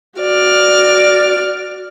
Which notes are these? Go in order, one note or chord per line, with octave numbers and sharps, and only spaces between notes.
F#4 D5 F6